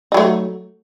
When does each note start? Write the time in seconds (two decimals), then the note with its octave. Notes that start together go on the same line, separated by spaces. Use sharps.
0.12 D#4
0.14 F#3
0.17 A3